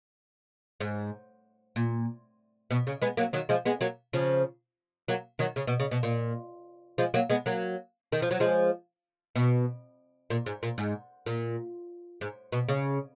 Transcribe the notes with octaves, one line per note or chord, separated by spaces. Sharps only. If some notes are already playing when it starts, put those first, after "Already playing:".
G#2
A#2
B2
C#3
G#3 B3
F#3 A#3
D#3 F#3
F3 G#3
G#3 B3
F#3 A#3
C#3 F3
F#3 A#3
D#3 F#3
C#3
B2
C#3
B2
A#2
F3 G#3
F#3 A#3
G#3 B3
F#3 A#3
D#3
F3
F#3
F3 G#3
B2
A#2
G#2
A#2
G#2
A#2
G#2
B2
C#3